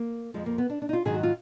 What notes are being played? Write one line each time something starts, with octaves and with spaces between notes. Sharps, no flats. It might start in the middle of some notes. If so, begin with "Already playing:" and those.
Already playing: A#3
F2 F3 G#3
A#3
B3
D4
D4
D#4
F4
G#2 D#3 F#3 G#4
F#4
F4